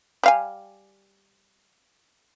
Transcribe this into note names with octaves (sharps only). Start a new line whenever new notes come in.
G3 F5 G#5